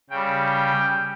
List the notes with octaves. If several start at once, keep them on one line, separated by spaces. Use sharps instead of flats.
C#3 G3 G5